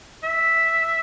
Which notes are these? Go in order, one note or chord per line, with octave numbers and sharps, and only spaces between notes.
E5